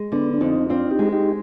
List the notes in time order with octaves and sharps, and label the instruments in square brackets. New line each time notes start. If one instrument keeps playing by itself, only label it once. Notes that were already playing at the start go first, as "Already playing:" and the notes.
Already playing: [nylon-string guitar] G#3
[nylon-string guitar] D3 [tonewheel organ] B3 D4
[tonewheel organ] D4
[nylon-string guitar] F2 [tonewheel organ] C4 D#4
[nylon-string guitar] C4 [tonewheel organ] D4 F4
[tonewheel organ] D#4 G4
[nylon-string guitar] G#3
[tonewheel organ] D#4 G4